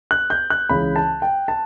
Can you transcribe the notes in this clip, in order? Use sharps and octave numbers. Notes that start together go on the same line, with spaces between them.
F#6
G6
F#6
C#2 C#3 E3 B5
A5
G5
A5